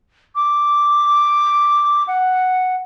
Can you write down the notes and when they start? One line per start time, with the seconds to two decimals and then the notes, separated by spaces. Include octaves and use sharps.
0.35 D6
2.08 F#5